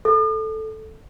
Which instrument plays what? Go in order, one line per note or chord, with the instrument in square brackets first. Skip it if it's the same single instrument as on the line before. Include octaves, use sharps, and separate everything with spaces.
[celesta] A4